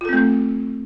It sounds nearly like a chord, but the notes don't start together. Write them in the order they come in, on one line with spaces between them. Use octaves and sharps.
F4 A4 C4 A3